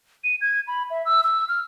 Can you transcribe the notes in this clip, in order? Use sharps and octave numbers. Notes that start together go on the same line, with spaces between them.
D#7
G#6
B5
E5
E6
E6
F6